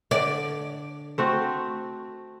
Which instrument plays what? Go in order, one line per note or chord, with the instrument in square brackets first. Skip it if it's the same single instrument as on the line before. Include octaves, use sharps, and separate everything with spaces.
[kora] D3 [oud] D5
[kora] A3 C4 F#4